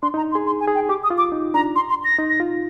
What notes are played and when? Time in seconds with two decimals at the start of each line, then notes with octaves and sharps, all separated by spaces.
0.02 D4 C6
0.14 D#4
0.17 A#5
0.32 C6
0.35 G#4
0.46 C6
0.60 G#5
0.67 G#4
0.75 G5
0.89 G4 D6
1.03 D#6
1.10 F4
1.18 D6
1.32 D#4
1.54 D4 A#5
1.76 C6
1.89 C6
2.04 A#6
2.19 D#4
2.30 A#6
2.40 F4